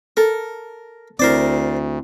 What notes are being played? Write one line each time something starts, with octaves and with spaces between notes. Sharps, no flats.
A4 A#4
D2 C4 E4 A#4 C5 D5